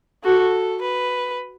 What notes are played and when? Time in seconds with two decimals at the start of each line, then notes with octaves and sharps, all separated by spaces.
0.24 F#4 A4
0.82 B4